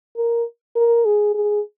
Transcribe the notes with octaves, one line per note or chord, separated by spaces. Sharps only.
A#4
A#4
G#4
G#4